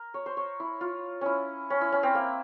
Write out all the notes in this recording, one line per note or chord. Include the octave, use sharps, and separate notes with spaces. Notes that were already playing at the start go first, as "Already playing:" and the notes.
Already playing: A#4
C#5
C5
C#5
E4
F4
C#4 E4
C#4
E4
C#4
C4
A#3